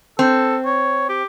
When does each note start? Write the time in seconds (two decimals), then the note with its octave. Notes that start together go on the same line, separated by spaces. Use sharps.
0.19 C4 A4
0.65 C#5
1.09 G4